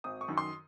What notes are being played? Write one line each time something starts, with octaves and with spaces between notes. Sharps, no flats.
G#1 D#6
C#6
F#2 D#3
C6